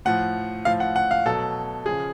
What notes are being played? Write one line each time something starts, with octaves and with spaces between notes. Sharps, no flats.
A2 F3 F#5
A2 F3 F5
F#5
F#5
F5
B2 F#3 A4
C#3 F3 G#4